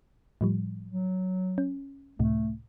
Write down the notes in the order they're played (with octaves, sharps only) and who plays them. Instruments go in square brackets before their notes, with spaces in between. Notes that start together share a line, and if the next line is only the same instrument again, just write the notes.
[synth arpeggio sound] A2 F3 G3
[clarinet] F#3
[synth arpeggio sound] C#4
[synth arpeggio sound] C#2 A2 C3 [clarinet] A3